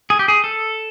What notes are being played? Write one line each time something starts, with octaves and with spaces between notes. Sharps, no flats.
G#4
G4
G#4
A4